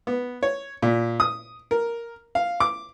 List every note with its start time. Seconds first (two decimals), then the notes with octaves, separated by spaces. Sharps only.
0.07 B3
0.43 C#5
0.82 A#2
1.20 D#6
1.71 A#4
2.35 F5
2.60 D6